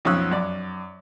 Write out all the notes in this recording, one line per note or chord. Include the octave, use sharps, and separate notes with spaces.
B1 F2 C#4 D#6 E6 F#6
F#2 D5